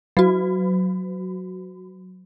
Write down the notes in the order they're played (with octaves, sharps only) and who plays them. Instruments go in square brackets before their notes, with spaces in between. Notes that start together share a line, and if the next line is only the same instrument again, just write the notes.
[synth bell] F#3 F#4